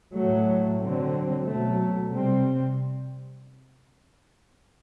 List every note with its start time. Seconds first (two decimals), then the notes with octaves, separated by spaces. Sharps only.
0.15 A2 F#3 A3
0.79 D3 F#3 C4
1.44 B2 F#3 A3
2.08 C3 G3 C4